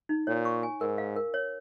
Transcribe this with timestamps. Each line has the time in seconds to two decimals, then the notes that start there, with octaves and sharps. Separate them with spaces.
0.09 D#4
0.27 A#2 C#5
0.45 C#6
0.63 G#5
0.81 G#2 A#4
0.98 F5
1.16 A#4
1.34 C#5